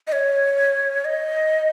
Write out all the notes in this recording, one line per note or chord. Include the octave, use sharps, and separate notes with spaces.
D#5
C#5
D#5